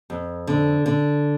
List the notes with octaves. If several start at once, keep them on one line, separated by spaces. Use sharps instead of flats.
F2
D3
D3